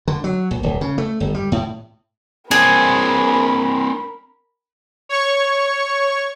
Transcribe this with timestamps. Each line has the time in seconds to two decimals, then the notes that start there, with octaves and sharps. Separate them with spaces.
0.08 D3
0.24 F#3
0.51 A#1
0.63 D1
0.81 C#3
0.98 A3
1.20 G1
1.35 G3
1.52 A2
2.51 C4 D4 G#4 A#4 B5
5.09 C#5 C#6